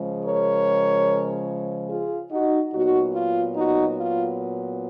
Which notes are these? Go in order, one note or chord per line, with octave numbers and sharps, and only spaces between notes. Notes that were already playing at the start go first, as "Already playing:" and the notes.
Already playing: C#3 F3 G#3
A#4 C#5
F4 G#4
D#4 F#4
A#2 F#3 B3 D#4 F#4
F4
D#4 F#4
F4